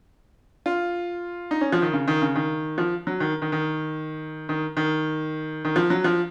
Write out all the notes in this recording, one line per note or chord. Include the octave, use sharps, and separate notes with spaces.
F4
D#4
C#4
F3
D#3
C#3
D#3
C#3
D#3
F3
F#3
D#3
D#3
D#3
D#3
D#3
D#3
F3
F#3
F3